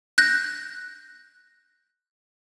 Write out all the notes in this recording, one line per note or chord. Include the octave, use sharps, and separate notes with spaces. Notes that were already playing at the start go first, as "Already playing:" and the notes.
F#6 G6 A#6